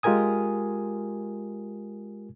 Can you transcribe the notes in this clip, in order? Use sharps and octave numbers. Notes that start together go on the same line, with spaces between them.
G#3 F4 G4 A#4 G#5 D#6